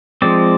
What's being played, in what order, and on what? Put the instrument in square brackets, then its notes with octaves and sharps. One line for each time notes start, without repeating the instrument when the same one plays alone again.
[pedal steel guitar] F3 G#3 C4 D5